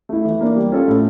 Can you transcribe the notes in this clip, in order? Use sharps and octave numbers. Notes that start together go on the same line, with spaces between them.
A3 E4
E3
A#3 D4
G3
C#4 F4 A4
A2